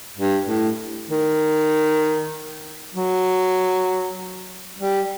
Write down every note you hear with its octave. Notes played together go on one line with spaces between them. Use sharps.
G2
A2
D#3
F#3
G3